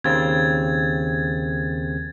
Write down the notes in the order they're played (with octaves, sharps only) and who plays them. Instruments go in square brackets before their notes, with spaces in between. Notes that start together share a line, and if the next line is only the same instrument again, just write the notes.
[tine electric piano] D#2 C#3 C4 [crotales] G#6 A6